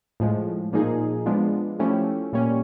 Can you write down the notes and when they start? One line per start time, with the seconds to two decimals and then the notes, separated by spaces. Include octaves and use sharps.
0.20 A2 F3 G#3
0.73 A#2 F3 A#3 D#4 G#4
1.26 F3 G#3 B3 D4 F4
1.79 F3 A3 C#4 E4 G4
2.33 A#2 G3 A#3 C#4